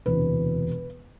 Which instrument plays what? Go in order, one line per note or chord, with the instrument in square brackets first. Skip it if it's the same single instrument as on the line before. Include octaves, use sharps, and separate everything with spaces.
[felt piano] E1 D2 C3 E3 B4